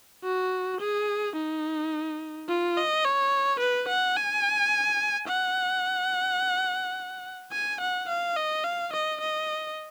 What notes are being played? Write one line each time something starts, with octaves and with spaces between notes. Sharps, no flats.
F#4
G#4
D#4
F4
D#5
C#5
B4
F#5
G#5
F#5
G#5
F#5
F5
D#5
F5
D#5
D#5